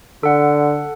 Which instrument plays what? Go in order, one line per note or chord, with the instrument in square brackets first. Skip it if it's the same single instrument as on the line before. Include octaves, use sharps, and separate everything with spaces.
[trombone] D3 [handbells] A4 F#5